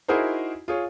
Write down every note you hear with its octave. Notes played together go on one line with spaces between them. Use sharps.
D#4 E4 F#4 G#4 A#4 C5
F4 G#4 C#5